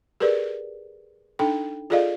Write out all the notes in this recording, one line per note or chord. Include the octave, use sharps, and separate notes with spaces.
G4 G#4 A#4 B4 D5
D4 D#4 A4 G5
F4 G#4 A4 D5 D#5 F5